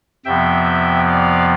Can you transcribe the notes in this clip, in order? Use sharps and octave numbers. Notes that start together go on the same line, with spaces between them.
F2 C3 F3 B3 E5 G5
D5 F5